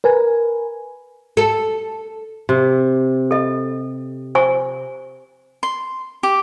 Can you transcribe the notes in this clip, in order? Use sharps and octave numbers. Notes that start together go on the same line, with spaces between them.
A#4 B4 G#5
A4
C3
A4 D#5
C5 G#5 C#6
C6
G4